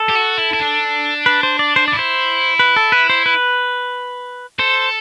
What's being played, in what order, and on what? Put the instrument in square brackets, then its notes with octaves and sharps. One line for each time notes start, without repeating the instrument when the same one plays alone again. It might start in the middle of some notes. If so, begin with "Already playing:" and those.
Already playing: [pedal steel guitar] A4
[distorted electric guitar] G4
F#4
E4
E4
D4
[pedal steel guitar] B4
C5
D5
C5
D5
[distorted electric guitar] E4
[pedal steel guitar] C5
B4
A4
B4
C5
B4
[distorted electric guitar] A4 [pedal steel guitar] C5